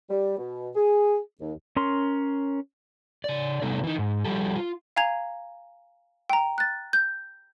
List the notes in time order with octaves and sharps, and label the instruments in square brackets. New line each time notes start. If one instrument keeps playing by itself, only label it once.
[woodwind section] G3
B2
G#4
D#2
[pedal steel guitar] C#4 A#4 C6
[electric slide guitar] C#3 D5
C3 G3 A3 B3 D#4
E3 D#4
G#2
F3 G3 G4 A4
F4
[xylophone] F5 G#5 A#5 G#6 F7
G5 A#5
F#6 A6
G6